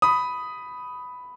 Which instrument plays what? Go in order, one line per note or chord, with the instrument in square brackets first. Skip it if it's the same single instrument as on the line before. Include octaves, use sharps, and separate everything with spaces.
[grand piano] B5 D#6